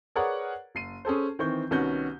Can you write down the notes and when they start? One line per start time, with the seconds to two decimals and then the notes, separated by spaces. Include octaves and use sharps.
0.16 G#4 A#4 B4 C#5 D5 F#5
0.75 F#1 C7 D#7
1.05 C#4 G#4 A4 C5
1.39 D#3 E3 C4 C#6 G6
1.71 C2 D#3 B3 C#4 F#4 G6